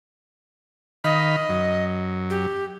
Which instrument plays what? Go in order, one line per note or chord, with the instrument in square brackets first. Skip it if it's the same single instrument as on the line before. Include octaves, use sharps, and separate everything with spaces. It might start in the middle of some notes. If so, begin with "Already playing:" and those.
[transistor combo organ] D#3 F5 B5 [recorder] D#5
[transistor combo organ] F#2
[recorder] G4